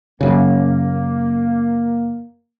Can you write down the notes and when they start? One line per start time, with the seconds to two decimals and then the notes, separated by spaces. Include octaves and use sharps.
0.21 F#2 C#3 A#3